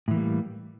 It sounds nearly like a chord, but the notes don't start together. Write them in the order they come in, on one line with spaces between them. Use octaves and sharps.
A2 E3 A#3 G3